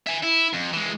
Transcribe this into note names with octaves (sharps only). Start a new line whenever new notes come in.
E5 G#5
E4
F2
E3 G#3